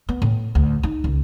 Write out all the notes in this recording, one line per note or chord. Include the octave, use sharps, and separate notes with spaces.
B3
A2
D2
D#4
C#2